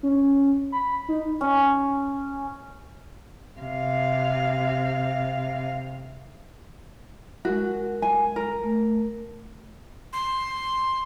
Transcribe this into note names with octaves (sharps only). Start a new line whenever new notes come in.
C#4
B5
D#4
C#4
C3 F5
G#3 F#4 A#4
G#5
A#4
A3
C6